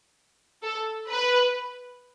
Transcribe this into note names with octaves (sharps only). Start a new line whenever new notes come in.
A4
B4